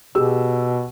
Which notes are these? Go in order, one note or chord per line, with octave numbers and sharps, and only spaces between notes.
B2 G4 G#4 E6